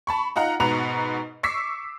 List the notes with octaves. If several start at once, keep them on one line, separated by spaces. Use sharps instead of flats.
A5 B5 C#6
D#4 F4 F#5 A#5
G#2 B2 B4 F#5 A#5 F7
C#6 D6 E6 B6 C7